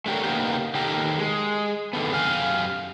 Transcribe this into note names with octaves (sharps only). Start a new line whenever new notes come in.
A3 D4 G4 A#4 C#5
C#3 A#3 B3 D#4 G4
D#3 G4 A4 A#4
G#3
D3 D#3 A3 B3
F#2 G4 F5 G#5